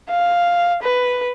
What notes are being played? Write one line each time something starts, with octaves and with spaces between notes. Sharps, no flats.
F5
B4